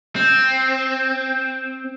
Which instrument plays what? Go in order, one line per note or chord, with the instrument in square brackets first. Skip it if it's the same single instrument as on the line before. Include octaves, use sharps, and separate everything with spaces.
[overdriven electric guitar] C4